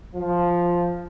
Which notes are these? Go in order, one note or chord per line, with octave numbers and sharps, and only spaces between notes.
F3